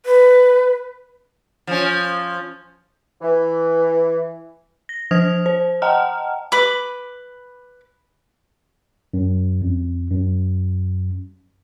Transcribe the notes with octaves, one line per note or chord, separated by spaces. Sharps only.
B4
F3 C#4
E3
A#6
F3 C5 D#6 F6 G#6 F7
C5
D#5 F#5 G5 A5 A#5 F6
B4 B5 D6
F#2
F2
F#2